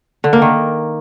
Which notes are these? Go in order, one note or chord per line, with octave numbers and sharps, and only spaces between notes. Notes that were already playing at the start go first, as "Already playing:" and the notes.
D3
A#3
D#3